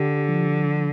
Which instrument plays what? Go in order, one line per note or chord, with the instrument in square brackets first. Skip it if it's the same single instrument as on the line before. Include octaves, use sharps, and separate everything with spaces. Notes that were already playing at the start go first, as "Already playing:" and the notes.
Already playing: [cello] D3 [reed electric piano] G4
[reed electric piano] F3